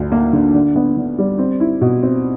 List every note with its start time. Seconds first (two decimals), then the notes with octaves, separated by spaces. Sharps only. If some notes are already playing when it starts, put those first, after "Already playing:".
Already playing: D2 D3
0.12 A#3
0.33 D3
0.54 D3
0.75 B3
0.97 D3
1.18 G3
1.39 C4
1.60 E4
1.81 B2
2.02 C4